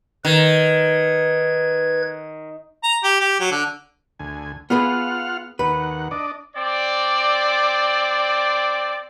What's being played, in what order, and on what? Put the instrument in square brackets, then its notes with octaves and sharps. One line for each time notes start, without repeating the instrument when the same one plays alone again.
[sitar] D#3 [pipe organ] B4 G#6
[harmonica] A#5
G4
G4
F#3
D3
[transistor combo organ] D2 G#5
[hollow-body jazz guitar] B3 G#4 B4 [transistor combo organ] F4 F#5 F6
[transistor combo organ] D#2 F#5 [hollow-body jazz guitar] B4
[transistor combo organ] D4 D5 D#5
[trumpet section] C4 D5